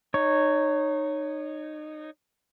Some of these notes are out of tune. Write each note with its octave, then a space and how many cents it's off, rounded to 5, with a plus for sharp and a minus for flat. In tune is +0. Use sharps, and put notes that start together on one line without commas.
D#4 -25 C#5 +0